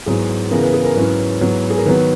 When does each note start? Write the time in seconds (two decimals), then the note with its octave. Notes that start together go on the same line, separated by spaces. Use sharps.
0.06 G#2 F#3 B3 E4 G#4
0.51 C#3 E3 B3 A#4
0.63 B4
0.74 G#4
0.85 A#4
0.96 G#2 F#3 C#4 E4 B4
1.41 G#2 F#3 B3 E4
1.70 G#4
1.78 A#4
1.86 D#3 F#3 B3 B4